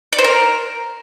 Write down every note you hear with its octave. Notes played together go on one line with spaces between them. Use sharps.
D5
C5
A#4